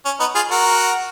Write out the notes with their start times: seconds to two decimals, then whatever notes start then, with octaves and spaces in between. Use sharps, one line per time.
0.05 C#4
0.20 B3 D#4
0.35 F4 G#4
0.51 F#4 A#4